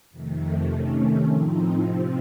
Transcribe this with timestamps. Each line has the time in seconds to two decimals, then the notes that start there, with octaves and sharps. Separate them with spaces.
0.11 F2 C3 D#3 A3
0.67 C3 D#3 A3 C#4
1.23 A2 F3 C4 D#4
1.80 C3 F3 C4